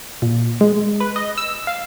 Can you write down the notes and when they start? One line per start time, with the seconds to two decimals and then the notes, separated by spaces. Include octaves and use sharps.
0.22 A#2
0.61 G#3
1.00 B4
1.16 D#5
1.38 E6
1.67 F5